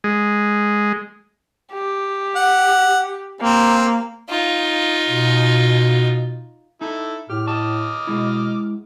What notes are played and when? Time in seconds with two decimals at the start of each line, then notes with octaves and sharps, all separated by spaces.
0.04 G#3
1.73 G4
2.35 F#5
3.41 A#3 C4
4.30 D#4 F4
5.07 B2
6.81 D#4 E4 A4
7.30 A2 G4 F6
7.47 D#5 A5 D6 F6
8.07 B2 G#3 E4